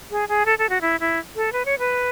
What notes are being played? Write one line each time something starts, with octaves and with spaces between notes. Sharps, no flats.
G#4
G#4
A4
A4
F#4
E4
E4
A4
B4
C#5
B4